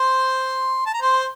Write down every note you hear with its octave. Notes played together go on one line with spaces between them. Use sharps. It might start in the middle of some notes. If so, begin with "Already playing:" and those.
Already playing: C5 C6
A5
A#5
C5 C6